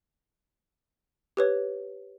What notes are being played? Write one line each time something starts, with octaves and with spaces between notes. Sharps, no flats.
G4 B4 C#5